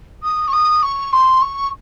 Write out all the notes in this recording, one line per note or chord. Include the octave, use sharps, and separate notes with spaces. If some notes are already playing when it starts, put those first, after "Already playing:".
D#6
C#6
D#6
C#6
C6
C#6